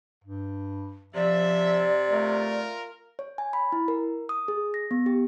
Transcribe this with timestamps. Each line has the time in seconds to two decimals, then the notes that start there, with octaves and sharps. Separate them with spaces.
0.24 G2
1.15 C3 F3 D5 E5
2.11 A3 F4 A#4
3.19 C#5
3.38 G#5
3.53 B5
3.72 E4
3.88 A#4
4.29 D#6
4.48 G#4
4.74 A#6
4.91 B3
5.06 G4